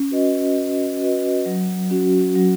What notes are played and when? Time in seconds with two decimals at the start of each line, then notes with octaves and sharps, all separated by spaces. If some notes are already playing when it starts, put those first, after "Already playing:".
Already playing: C#4
0.11 F#4 B4 D#5
0.57 C#4
1.01 F#4 B4 D#5
1.46 F#3
1.91 C#4 F#4
2.35 F#3